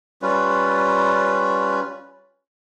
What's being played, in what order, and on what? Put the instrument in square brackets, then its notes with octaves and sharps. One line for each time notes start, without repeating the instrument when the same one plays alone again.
[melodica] G3 C#4 F4 B4